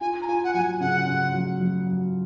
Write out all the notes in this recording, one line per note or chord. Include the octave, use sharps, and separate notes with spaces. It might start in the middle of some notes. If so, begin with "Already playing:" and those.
F4 G#5
A#5
F4 G#5
F#5
F#3 G#5
C#3 F#5
C#3
F#3
F#3
F#3